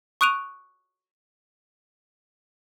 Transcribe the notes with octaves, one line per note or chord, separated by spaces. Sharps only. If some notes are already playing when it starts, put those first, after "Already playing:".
C#6 D#6 F#6 D7 D#7 F7